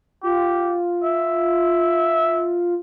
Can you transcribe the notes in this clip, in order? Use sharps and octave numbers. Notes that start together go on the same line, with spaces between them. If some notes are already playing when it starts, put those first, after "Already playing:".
F4 G4
E5